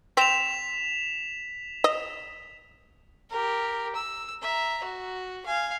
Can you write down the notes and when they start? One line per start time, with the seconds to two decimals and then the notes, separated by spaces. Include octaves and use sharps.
0.17 C4 B6 E7 F7
1.84 D#5
3.30 G4 A#4
3.95 E6
4.42 E5 A#5
4.83 F#4
5.46 F5 G#5